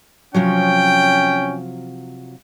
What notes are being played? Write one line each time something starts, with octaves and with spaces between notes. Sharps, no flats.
C3 F3 F#3 C#4 G5